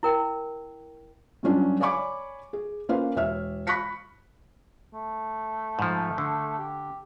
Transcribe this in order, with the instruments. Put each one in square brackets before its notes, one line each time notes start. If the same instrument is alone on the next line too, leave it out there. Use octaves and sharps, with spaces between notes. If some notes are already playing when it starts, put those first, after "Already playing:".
[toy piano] E4 A#4 G5
[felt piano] G2 F#3 C#4 D4 F4
C#5 D5 G#5 B5 C#6 D6
G#4
A#3 C#4 F4 B4 C5 F5
E1 C#5 E5 F6
B5 C#6 F#6 A#6 B6 C#7
[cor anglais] A3
[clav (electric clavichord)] G#2 F3
D3
[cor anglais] G4